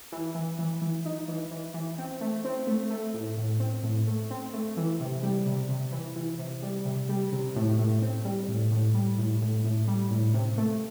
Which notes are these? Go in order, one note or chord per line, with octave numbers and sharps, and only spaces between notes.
E3
E3
E3
E3
D#4
E3
E3
E3
C4
A3
C4
A3
A3
A2
A2
C4
A2
A3
C4
A3
E3
C3
G3
C3
C3
E3
E3
C3
G3
C3
G3
C3
A2
A2
C4
G3
A2
A2
G3
A2
A2
A2
G3
A2
C3
A3